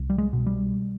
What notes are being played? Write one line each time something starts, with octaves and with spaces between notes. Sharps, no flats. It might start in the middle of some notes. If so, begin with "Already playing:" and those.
Already playing: C2
G3
G#3
B2
G3